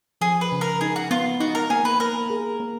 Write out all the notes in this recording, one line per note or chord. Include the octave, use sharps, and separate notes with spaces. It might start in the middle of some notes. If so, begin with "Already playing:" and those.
F3 G#4
B4
C#3
A#4
D#4 G#4
F#4
B3 F4
D#4 F#4
A#4
A#3 G#4
B4
A#3 A#4
G#4
A#3